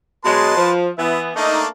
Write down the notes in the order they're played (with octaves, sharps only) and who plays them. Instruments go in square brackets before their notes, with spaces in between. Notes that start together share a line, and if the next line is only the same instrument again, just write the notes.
[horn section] B2 F#3 G#3 [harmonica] B4 A5 C6
[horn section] F3
[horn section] E3 B3 [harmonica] E5
[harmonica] A3 A#3 D4 [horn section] D#4